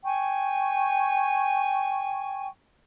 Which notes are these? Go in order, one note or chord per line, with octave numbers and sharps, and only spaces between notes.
G5 G#5 C#6